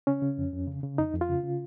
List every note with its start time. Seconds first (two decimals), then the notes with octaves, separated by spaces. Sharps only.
0.07 C#3 C#4
0.22 C#3
0.38 F2
0.53 F2
0.68 C#3
0.83 C#3
0.98 F2 D#4
1.14 F2
1.21 F4
1.29 C#3
1.44 C#3